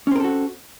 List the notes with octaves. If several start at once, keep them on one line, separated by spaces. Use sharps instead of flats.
C4 C#4 F#4 A4 A#4